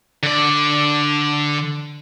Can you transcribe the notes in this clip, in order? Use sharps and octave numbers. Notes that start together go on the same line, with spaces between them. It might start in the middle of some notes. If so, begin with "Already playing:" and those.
D3 D5